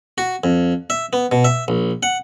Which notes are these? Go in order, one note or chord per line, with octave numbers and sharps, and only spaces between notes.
F#4
F2
E5
B3
B2
E5
A#1
F#5